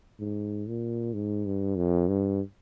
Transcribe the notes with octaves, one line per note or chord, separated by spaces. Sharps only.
G#2
A#2
G#2
G2
F2
G2